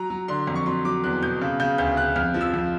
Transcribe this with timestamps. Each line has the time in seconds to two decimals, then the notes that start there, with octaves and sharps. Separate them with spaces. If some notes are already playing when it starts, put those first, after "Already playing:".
Already playing: F#3 A#5
0.10 F#3
0.28 D3 C6
0.47 F2
0.56 C#6
0.66 F#3 C6
0.85 F#3 D6
1.04 E2 F#6
1.22 B2 G6
1.41 C#3
1.60 C#3 G6
1.78 D2 G6
1.97 C#3 F#6
2.16 F2 F6
2.34 F3
2.41 E6
2.54 F2